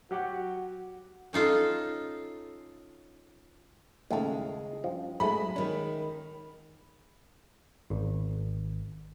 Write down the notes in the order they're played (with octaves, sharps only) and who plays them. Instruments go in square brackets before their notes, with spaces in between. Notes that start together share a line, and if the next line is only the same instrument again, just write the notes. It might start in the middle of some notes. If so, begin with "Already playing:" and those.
[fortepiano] F#3 G4 F#5 [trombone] F#4
[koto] C#4 D#4 F4 A4
[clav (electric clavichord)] D#2 A2 A3 [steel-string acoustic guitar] C#3 G#3
[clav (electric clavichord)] G2 F3
[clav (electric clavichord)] G#2 A3 [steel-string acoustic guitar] F#3 G#3 [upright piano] B5
[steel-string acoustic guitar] D#3 G#3 [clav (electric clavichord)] C#4
[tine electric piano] G#1